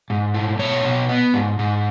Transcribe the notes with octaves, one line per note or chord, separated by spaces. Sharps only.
G#2
A3
B2 C#5
B2
B3
G#2
G#2